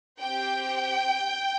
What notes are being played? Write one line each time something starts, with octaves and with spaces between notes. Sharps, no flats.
C4 G4 G5